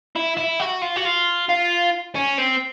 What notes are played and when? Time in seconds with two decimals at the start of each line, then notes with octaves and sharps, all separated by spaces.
0.16 E4
0.37 E4
0.60 F#4
0.82 F4
0.96 F#4
1.05 F4
1.49 F4
2.15 C#4
2.38 C4